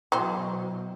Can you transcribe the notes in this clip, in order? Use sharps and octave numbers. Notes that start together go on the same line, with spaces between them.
B2 E3 F#3 C5